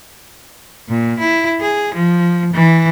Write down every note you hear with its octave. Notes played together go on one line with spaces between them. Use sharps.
A#2
E4
G#4
F3
E3